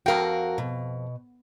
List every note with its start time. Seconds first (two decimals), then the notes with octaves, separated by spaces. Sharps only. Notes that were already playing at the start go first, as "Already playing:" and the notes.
0.06 F2 F#4 A#4 F5 G5
0.58 B2